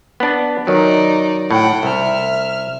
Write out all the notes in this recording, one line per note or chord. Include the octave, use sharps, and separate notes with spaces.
B3 D4
D#3 F#3 D#4 D5
A2 F#5 G5
C2 E5 F6